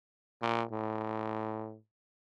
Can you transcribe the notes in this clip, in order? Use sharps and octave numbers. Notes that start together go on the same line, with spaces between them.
A#2
A2